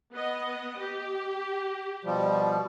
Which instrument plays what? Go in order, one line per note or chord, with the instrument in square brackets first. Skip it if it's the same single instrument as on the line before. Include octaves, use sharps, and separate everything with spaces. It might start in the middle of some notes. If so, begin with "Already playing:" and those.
[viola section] B3 D#5
G4
[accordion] B2 F3 G3